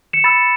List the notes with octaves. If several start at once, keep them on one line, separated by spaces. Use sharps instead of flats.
C#7 E7
B5 E6 A6 C#7